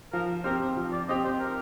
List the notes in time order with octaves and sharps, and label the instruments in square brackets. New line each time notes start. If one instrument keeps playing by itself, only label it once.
[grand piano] F3 [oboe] A#4
[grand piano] C4 G4 [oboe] A#4
[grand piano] F3
[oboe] D5
[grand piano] C4 G4 [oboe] D#5
[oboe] C5
A#4